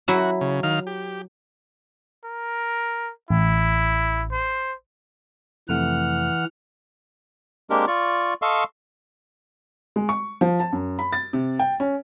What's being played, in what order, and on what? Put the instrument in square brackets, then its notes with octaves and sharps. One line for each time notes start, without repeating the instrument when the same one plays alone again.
[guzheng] F#3 E4 [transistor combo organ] F#4
[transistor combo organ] C#3
D#3 F5 F6
G4
[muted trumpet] A#4
[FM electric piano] A1 [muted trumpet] E4
[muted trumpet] C5
[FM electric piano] F2 C3 A3 [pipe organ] E3 F#5 F6
[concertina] G#3 A#3 C4 D4 G4 A#4
F4 D5 C#6
A4 D#5 F5 C6 C#6 E6
[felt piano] G#3
C#6
F3
A5
F#2
B5
A6
C3
G5
C#4